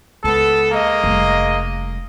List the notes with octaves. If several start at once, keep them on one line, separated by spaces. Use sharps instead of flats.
C#2 B3 A4
G#3 A#3 D#5
F1 G3